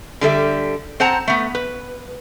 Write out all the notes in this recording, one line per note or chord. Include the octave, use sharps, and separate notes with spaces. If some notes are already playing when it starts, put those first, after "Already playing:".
D3 G3 A4 E5
C4 C5 F#5 A5 A#5
A3 B3
B4